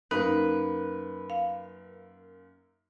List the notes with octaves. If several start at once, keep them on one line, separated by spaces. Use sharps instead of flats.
F#2 A#3 D#4 B4
F5